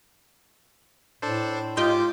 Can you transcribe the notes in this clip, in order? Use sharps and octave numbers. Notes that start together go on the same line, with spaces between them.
A2 D4 A4 C5
G#2 D#4 F4 G4 G5 C6 D6